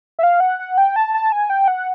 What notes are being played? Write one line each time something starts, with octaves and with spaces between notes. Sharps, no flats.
E5
F5
F#5
F#5
G5
A5
A5
G#5
G5
F#5